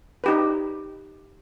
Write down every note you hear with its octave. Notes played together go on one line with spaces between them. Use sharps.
D#4 G4 B4